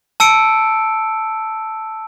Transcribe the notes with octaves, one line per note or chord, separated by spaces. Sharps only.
A5 E6 C#7 D7